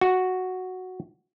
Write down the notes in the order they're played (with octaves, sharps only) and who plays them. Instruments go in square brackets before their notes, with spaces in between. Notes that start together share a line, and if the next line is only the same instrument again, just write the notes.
[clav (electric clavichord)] F#4